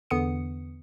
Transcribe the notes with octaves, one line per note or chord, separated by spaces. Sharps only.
E2 D3 B3 D#6 C#7